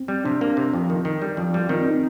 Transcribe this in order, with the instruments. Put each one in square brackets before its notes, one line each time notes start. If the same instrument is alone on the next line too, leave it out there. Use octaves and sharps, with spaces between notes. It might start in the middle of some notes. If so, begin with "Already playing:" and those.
Already playing: [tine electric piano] C4
[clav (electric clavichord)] G3
[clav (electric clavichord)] C3 [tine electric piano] D4
[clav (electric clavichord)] A#3
C3
F2
D#3
D#3
G3
F2
G3
[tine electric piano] F4
[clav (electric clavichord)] D#3 [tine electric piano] C4 D#4
[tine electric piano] C4 D#4